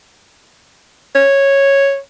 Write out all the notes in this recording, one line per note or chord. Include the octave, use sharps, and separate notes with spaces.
C#5